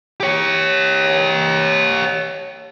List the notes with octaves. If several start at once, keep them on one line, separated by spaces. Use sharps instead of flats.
G4 C#5